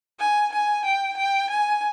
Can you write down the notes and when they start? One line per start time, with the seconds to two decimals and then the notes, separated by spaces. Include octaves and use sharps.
0.19 G#5
0.52 G#5
0.85 G5
1.17 G5
1.50 G#5